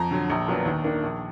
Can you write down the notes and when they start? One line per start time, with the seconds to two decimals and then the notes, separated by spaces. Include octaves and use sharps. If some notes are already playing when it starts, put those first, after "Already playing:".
Already playing: F2 A#5
0.11 D3 F#3
0.30 A#1
0.48 A#2 F#3 B3 D4
0.66 D#2
0.84 D#3 A#3 D4
1.03 A#1